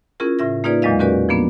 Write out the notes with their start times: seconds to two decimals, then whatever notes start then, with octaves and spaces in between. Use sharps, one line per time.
0.20 C#4 E4 F4 G#4 A#4
0.39 A2 C#3 E5 A#6
0.64 A#3 D#4 F4 G#4 B4 D5
0.82 E2 A#2 F#3 G#3 D#5 F5
0.99 C#4 F#4 G4 A#4 B4 D5
1.29 F3 A#3 B3 D4